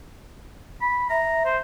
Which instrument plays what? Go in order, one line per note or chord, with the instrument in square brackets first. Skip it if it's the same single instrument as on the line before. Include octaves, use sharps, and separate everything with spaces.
[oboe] B5
[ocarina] E5 [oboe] A#5
[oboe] C5